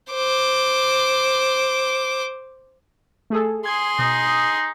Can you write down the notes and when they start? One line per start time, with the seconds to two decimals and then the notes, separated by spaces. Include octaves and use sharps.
0.12 C5 D6
3.30 A3 G#4 A4
3.66 G#4 C6 G#6
3.99 B2 D#4